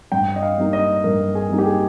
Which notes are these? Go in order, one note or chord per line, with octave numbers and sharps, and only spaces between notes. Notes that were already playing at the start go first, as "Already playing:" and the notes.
G2 G5
D#5
F5
G3 A#3 D#4
D#5
G2 A#4
G#4
G3 A#3 D#4
G4
G#4